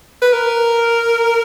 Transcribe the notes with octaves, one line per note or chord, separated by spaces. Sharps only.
B4
A#4